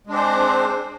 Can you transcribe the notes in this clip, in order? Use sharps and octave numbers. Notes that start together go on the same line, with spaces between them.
G#3 C4 D4 C5